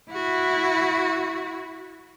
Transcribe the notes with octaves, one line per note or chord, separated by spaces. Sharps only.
E4 F#4